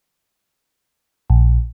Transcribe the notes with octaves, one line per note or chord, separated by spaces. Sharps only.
A#1